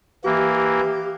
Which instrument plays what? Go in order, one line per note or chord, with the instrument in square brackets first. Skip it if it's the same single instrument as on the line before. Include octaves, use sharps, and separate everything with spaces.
[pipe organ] E3 A#3 [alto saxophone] G4